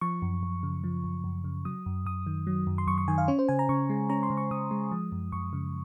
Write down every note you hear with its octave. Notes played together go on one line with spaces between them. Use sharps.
F3 C#6
F#2
F#2
C#3
F3
F#2
F#2
C#3
F#3 D#6
F#2
F#2 D#6
D#3
F#3
F#2
C6
F#2 C#6
C#6
D#3 G#5
F5
C#4 C#5
C5
C#3 G#5
A#5
C#3 C#6
G#3
C#4 A#5
C6
C#3
C#6
C#3 D#6
G#3
F3
F#2
F#2 C#6
C#3